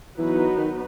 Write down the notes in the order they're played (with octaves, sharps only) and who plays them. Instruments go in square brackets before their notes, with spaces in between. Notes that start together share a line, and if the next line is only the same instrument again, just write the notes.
[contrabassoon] E3 [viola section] F#3 B3 D#4 F#4 B4
[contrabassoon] D#3